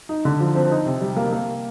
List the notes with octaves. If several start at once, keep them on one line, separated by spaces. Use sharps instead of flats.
D#4
D3
F3
C4
D#4
C3
G3
A#3
A#3